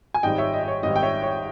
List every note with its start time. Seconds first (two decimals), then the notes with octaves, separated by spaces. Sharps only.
0.14 G#5
0.23 G#1 G#2 G3 D#5 G5
0.38 C#5 E5
0.53 D#5
0.64 D#5
0.68 C#5
0.83 G#1 G#2 G3 D#5
0.96 G5
1.03 C#5 E5
1.23 C#5